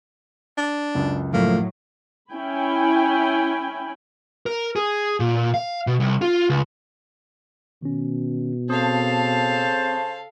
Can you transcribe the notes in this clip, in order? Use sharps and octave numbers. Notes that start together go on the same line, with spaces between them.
D4
C#2 F#2
A2 F3 F#3 A3 A#3
C#4 E4 G5 G#5 B5
A#4
G#4
A#2
F5
B2
C2
F4
C#2
B2 D#3 C#4
C#3 C4 A4 C5 F5 A5 D#6